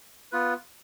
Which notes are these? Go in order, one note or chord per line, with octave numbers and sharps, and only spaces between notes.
B3 F4 B4